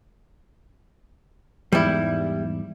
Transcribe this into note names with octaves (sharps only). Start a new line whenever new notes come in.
E2 G#2 G3 E4